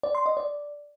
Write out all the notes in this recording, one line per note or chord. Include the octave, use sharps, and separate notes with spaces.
D5
C6
D#5
D5